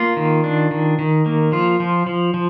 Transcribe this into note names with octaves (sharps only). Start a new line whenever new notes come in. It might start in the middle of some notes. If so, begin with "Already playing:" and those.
Already playing: A#3 F4
D#3
D4
D#3
D#3
A#3
F3 F4
F3
F3
F3